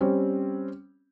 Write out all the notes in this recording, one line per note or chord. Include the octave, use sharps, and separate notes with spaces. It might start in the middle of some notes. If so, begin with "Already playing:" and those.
G3 C4 C#4